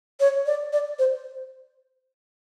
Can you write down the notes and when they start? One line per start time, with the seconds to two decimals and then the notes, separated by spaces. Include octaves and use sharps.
0.20 C#5
0.46 D5
0.73 D5
0.99 C5